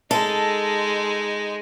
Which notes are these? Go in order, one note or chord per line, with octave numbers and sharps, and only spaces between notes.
G#3 D#4 A4